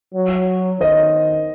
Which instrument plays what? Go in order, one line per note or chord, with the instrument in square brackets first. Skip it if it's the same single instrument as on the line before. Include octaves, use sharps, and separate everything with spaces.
[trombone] F#3
[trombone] D#3 [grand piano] C5 D#5